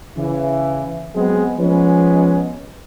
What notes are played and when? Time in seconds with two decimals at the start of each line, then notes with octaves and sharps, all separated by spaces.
0.17 C#3 E3
1.15 F#3 G#3 B3 C4 G#4
1.59 F3 G#3 B3 C#4 B4